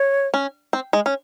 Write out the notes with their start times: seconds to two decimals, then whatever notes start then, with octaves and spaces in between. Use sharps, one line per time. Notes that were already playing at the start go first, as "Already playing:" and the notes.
Already playing: C#5
0.34 C#4
0.73 C4
0.93 G#3
1.06 C#4